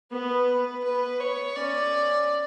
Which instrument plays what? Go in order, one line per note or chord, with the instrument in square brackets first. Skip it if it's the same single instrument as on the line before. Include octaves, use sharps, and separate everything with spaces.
[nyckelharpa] B3 [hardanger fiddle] B4
[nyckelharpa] B3 [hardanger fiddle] B4
[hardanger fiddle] C#5
[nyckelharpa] C#4 [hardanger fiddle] D5